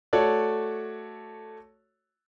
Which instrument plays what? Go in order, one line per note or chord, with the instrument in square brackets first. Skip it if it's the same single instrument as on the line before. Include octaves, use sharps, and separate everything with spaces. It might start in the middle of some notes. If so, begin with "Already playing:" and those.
[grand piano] A3 F#4 A4 C#5 D5